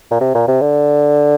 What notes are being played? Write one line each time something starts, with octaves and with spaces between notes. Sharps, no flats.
A#2
C3
A#2
C3
D3